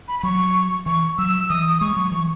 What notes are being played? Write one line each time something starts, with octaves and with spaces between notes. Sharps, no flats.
B5
B5
F#3 C#6
E3 C#6
F#3 E6
E3 D#6
D#6
G#3 C#6
F#3
E3